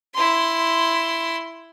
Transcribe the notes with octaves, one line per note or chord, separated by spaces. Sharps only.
E4 C6